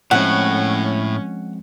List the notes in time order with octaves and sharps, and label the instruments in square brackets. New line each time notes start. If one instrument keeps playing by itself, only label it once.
[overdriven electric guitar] A2 [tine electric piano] F3 G#3 C4 [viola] C#4 [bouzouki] F#5